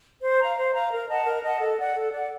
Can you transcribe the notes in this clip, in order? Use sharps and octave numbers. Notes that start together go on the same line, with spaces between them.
C5
F5 A#5
C5
F5 A#5
A#4
D#5 F#5 A5
A#4
D#5 F#5 A5
A4
D5 F#5
A4
D5 F#5